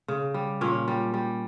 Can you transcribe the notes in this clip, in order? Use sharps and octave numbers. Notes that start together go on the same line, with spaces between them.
C#3
G3
A#2 C#4
G3
G3